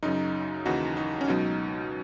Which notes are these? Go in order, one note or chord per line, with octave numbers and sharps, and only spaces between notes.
F#2 C#3 F#3 D#4
D#2 C#3 E3 D#4 F#4
D#4
C#4
C#2 B2 F#3 D#4